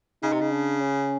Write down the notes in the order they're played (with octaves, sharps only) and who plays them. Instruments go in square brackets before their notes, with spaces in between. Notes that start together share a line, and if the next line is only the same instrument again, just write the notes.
[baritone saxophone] C#3 [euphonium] D#4
[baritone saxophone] C3
C#3
[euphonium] D4
C#4